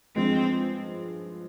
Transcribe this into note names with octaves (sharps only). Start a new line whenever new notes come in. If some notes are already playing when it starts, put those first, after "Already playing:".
G2 F3 G#3 C4